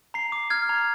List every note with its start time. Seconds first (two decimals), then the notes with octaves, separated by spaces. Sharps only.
0.14 A#5 C7
0.32 D6
0.50 F6 G#6
0.69 A#5